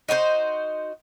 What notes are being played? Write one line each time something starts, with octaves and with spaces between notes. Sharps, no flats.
D#4 F#4 B4 C5